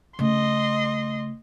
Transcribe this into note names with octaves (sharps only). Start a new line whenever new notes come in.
C#3 A3 D#5 C6